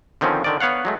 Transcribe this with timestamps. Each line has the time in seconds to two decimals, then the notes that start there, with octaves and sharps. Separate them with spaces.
0.21 D3 D#3 F3 C4 C#4
0.44 D3 D#3 D5
0.60 B3 C#5 F5 F#5
0.85 F#3 G#3 A3